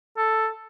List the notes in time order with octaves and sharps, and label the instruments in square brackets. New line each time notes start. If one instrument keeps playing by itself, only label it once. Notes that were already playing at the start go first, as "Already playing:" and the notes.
[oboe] A4